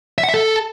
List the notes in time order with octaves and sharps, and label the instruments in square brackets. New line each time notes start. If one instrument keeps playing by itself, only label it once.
[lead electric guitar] E5
F#5
E5
A4